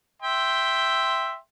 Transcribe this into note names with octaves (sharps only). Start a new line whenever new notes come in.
E5 G5 C6